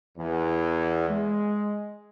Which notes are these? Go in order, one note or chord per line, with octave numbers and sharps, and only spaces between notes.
E2
G#3